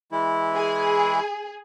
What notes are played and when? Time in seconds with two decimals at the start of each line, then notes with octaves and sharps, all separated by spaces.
0.12 E3 G#3 E4
0.54 G#4